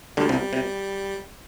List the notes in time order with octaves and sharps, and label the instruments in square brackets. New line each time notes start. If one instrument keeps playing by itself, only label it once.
[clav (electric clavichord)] D2 D3 [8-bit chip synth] G3
[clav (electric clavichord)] C2 C3
C3